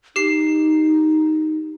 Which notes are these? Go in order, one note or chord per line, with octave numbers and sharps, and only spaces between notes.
D#4 G4 C7